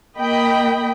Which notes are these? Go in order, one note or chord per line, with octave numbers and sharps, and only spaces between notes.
A#3 D#5 G5 B5